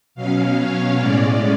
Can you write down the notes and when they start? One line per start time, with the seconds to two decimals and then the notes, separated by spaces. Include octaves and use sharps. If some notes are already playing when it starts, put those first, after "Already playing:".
0.15 B2 F#3 C#4 F5
0.57 C#5
0.98 A2 G#3 C#4 D5